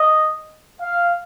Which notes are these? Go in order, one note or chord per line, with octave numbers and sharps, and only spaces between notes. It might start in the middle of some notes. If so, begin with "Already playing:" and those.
Already playing: D#5
F5